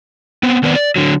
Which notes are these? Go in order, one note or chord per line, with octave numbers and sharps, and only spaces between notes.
B3 C4
D#3 B3 C4 B4 D5
D5
D3 F#3